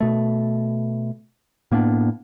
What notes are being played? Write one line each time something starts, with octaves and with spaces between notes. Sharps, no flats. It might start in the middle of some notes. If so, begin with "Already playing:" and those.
B2 A3
A2 A#3 B3 D4